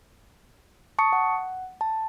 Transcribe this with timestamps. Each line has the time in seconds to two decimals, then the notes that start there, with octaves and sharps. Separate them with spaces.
0.99 A5 C#6 D#6 C#7
1.13 F#5
1.81 A5